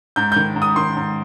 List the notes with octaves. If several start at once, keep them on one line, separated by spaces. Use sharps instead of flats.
G#2 G6
D#3 G6
G#2
D#6
D#3 C6
G#2